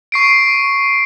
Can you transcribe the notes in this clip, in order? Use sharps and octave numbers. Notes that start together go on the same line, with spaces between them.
C#6 C7 D7